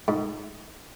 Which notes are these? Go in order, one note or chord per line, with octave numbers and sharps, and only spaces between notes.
G#2